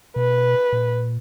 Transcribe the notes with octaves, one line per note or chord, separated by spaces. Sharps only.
B2 B4
A#2